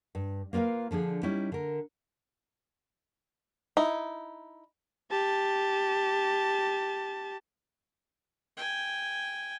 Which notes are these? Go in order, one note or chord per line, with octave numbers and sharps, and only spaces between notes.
G2
A#3 F4 A#4 B4 F5
D3 F3 D4 G#4
G3 C#4 D#4 E4
D3 A#4
D#4 E4
G4 A5
G5 G#5